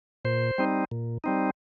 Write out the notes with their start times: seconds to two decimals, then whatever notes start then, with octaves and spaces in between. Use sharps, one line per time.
0.25 A#2 C5
0.58 G3 C4 D#4
0.91 A#2
1.24 G3 C4 D#4